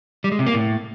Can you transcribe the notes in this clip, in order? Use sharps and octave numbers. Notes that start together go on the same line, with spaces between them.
G3
G#3
C3
A#3
A2